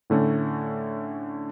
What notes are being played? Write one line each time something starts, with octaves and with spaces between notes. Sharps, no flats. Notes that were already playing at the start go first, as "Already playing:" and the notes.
A2 D3 A3 C#4